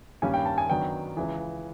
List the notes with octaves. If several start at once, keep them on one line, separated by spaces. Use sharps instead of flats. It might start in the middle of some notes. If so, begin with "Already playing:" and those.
G2 D#3 G3 A#3 C#4 G#5
G5
A5
G#5
F#2 D#3 F#3 B3 D4 G5
C#2 C#3 E3